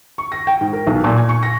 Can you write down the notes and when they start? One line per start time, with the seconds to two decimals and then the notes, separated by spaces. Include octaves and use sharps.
0.18 C#6
0.32 A#6
0.47 G5
0.61 G#2
0.73 A#4
0.87 B1
1.04 A#2
1.17 G#5
1.29 C#6
1.43 A#6